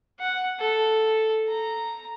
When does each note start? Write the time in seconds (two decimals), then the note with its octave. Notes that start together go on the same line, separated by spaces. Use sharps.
0.20 F#5
0.60 A4
1.48 A#5